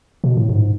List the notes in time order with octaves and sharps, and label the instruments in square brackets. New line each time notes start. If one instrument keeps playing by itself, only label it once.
[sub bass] B2
A2
G#2